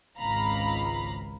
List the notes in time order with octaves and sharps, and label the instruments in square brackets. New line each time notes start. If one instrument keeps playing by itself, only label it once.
[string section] G#1 C#2 F5 A#5 B5